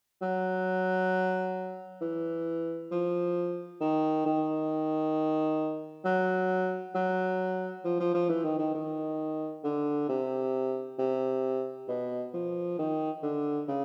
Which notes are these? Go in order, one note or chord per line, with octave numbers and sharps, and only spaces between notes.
F#3
E3
F3
D#3
D#3
F#3
F#3
F3
F3
F3
E3
D#3
D#3
D#3
D3
C3
C3
B2
F3
D#3
D3
C#3